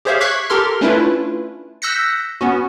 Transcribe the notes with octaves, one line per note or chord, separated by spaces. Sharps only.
G4 G#4 C5 C#5 E5 F5
C#6 D6 F#6 G#6 B6 C7
G4 A4 A#4 C6 F6
A3 C#4 D4 E4 F4 B4
E6 F#6 G6 A#6 B6 C#7
B3 C#4 F#4